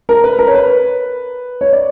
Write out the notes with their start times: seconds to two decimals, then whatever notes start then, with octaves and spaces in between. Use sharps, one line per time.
0.09 A#4
0.24 B4
0.39 A#4
0.47 C#5
0.54 B4
1.61 C#5
1.73 D5